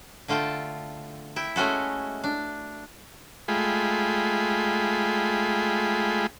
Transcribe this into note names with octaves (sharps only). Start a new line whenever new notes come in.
D3 A3 F4 G5 A5
E4 E5 G5
G#3 A3 C#4 F#4 A4
D4
G#3 A3 F4 G#4 G5 B5